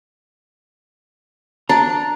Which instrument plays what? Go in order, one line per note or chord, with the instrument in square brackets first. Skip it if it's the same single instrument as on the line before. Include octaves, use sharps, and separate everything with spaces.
[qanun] D4 [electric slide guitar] A#5